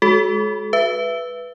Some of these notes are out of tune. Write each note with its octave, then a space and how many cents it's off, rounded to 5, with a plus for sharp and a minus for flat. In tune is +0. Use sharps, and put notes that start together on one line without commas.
G#3 +0 F#4 +0 A4 -40
B4 +0 E5 +25